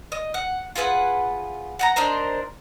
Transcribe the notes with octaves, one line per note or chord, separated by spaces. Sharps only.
D#5
F#5
F4 G#4 B4 F#5
F#5 G5 A#5
D4 D#4 A#4 C5